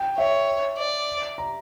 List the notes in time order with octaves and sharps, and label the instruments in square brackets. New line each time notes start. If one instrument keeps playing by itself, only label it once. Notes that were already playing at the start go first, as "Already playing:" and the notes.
Already playing: [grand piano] G5
[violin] C#5 [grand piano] E5
[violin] D5
[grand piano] A#5